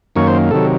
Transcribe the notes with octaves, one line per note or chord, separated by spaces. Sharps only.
F#2 D#3 A#3 C#5
C5
C3 D#3 F#3 A4